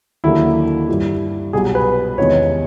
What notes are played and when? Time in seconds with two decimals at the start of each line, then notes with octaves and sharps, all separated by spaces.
0.24 D#2 D3 F#3 A#3 E4
0.89 G2 E3 G3
1.53 C2 B2 F#3 G#4
1.75 B4
2.18 E2 C3 D#3 G#3 B3 C#5